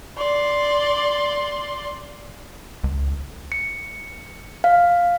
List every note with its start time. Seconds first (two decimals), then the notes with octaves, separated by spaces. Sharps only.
0.18 D5 C6
2.84 C#2
3.52 C#7
4.64 F5